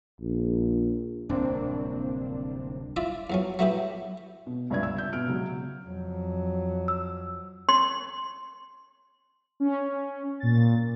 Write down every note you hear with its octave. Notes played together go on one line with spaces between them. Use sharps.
A#1
D1 C2 A#3 C4 D4
E4 F4 D5 E5
E2 F#3 C#4
F#3 A3 B3 E4 G4
B2
C#2 G2 C#4 D5 E5 G#6
E6
E5 G6
B2 F6 D7
C#3 F#3
F2 F#3
E6
C6
C#4
A#2 A6